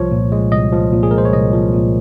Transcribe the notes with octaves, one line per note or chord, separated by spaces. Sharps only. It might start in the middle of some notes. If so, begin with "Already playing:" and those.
Already playing: C2 F3 C#5
A#2
G#3
C2 D#5
F3
A#2
G#4
G#3 A#4
C5
C#5
C2 D#5
F3
A#2